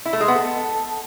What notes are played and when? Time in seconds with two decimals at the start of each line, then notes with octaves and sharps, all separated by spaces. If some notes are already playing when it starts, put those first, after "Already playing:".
0.06 E4
0.13 A3
0.21 G#3
0.28 B3
0.35 A4